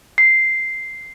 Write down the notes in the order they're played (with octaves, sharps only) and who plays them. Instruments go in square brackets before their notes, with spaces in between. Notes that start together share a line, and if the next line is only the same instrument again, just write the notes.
[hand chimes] C7